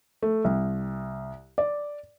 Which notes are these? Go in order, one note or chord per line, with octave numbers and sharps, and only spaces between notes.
A3
C2
D5